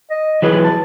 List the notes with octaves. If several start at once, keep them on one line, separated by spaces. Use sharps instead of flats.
D#5
E3 F#3 G#4 B4
A5